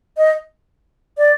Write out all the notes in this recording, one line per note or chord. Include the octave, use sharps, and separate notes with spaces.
D#5
D5